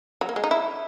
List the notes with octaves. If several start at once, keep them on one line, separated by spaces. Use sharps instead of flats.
F#3
A#3
G#3
D#4
E4